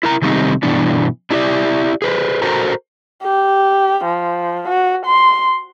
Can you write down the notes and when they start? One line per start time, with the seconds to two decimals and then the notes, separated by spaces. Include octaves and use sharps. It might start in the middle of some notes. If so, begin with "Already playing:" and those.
0.03 E4 A#4 A#5
0.22 C3 D#3 G3 A3 C4 D#4
0.63 G2 B2 E3 B3 D4 E4
1.31 D4 E4 G4 A4 D5 E5
2.02 G#4 B4 C5
2.42 F#4 A4 A#4 C5 A#5
3.23 G4
4.05 F3
4.69 F#4
5.06 C6